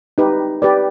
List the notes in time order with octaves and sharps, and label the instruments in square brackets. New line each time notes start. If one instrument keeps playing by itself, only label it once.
[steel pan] D#4 G4 B4
G4 B4 D5